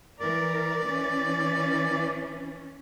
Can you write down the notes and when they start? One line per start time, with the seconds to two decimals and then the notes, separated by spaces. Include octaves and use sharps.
0.20 E3 A#4 D5
0.86 E3 C#4